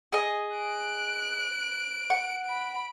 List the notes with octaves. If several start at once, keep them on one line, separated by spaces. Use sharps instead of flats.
G#4 D#5
F#6 D7
F#5
B5 D7